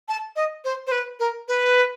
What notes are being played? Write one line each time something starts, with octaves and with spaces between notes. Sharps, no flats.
A5
D#5
C5
C5
B4
A#4
B4